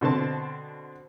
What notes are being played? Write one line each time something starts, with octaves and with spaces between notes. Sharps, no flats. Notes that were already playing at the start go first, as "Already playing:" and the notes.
B2 D3 C4 A5